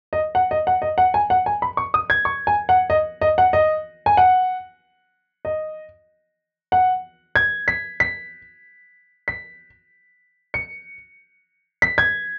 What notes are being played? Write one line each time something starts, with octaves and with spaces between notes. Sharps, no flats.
D#5
F#5
D#5
F#5
D#5
F#5
G#5
F#5
G#5
B5
C#6
D#6
G#6
C#6
G#5
F#5
D#5
D#5
F#5
D#5
G#5
F#5
D#5
F#5
G#6
B6
B6
B6
C#7
B6
G#6